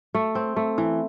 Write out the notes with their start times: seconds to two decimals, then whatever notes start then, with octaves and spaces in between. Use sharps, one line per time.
0.14 A3
0.35 C4
0.56 A3
0.78 E3